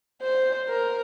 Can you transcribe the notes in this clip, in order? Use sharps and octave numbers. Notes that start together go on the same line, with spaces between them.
C5
A#4